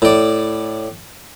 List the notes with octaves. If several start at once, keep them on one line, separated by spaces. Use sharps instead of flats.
A2 D5